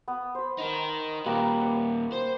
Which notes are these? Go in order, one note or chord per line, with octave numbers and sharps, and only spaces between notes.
B3
C5 B5
D#4 A#4
D#2 A#2 G3 A#3 B4
D5 F#5
C5